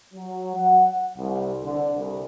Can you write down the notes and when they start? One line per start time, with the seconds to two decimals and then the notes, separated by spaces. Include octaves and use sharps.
0.14 F#3
0.56 F#5
1.17 C2
1.64 D3
1.96 C2